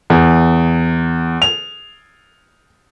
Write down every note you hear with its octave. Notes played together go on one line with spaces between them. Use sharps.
E2
F7